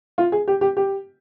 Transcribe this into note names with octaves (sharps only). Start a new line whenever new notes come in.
F4
G#4
G4
G4
G4